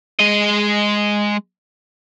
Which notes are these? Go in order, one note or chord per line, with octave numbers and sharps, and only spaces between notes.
G#3 D#5